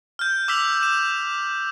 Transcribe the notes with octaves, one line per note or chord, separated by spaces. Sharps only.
F6 G6
D6 E6 F6 B6 F7 F#7
E7